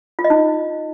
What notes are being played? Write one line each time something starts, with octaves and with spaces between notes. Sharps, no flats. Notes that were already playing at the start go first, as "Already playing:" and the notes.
F4
D#5
D#4